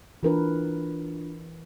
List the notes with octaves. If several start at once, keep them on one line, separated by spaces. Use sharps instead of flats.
E3 D4 F4 A#4 B4